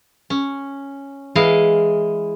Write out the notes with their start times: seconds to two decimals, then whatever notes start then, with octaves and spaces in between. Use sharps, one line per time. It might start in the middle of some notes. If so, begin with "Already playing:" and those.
0.30 C#4
1.35 E3 G#3 E4 D#5 F5